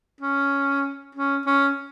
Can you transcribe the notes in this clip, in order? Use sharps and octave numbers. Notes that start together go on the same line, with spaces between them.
C#4
C#4
C#4